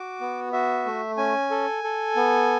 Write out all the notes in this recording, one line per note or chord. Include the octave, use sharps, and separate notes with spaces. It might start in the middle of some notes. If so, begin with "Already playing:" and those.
Already playing: F#4 D6
B3
F#4 E5
A3
C#4 G#5
A4
A4
B3